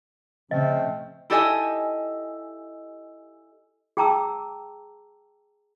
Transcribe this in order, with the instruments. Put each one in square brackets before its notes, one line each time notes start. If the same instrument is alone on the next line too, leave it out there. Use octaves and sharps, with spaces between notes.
[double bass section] C#3 [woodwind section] F3 A3 C4 [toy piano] D#5
[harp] E4 G4 A4 D#5 E5 G#5
[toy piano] G#4 G5 A5 A#5 D6 E6